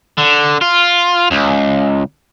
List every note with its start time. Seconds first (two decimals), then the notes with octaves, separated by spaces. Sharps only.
0.18 D3
0.61 F4
1.31 C#2